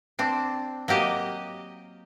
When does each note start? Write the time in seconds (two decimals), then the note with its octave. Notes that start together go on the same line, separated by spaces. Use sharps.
0.19 C4 D4
0.88 F#3 A#3 G4 D#5